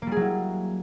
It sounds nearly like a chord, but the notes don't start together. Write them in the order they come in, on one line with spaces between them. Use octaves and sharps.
A#3 G3 G#4 F#3 E4